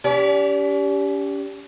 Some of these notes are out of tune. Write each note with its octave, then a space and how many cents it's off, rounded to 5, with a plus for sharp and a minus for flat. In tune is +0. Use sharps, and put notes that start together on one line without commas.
C#4 +40 G4 +0 D5 -30